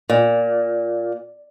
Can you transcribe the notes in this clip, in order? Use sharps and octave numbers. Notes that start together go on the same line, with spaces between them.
A#2